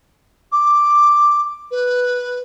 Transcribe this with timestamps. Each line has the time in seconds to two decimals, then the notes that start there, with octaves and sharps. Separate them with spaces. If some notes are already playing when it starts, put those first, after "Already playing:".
0.52 D6
1.71 B4